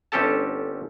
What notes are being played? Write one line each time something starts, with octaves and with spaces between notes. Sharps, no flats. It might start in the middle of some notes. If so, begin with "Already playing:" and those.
G1 C4 C#4 G4 A4 A5